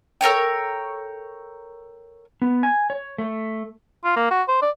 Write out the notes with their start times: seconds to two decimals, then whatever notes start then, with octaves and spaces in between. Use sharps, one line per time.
0.21 A4 A#4 C#5 G5
2.42 B3
2.63 G#5
2.90 C#5
3.18 A3
4.05 F4
4.16 A#3
4.31 F#4
4.48 C5
4.62 D5